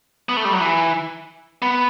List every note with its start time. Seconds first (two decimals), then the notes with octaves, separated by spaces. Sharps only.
0.29 B3
0.37 A3
0.45 G3
0.53 F#3
0.60 E3
1.62 B3